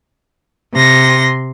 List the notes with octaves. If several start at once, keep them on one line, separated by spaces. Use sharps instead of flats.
C3 C6 A#6